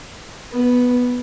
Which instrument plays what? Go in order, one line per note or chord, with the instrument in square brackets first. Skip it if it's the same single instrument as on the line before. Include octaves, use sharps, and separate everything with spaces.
[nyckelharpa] B3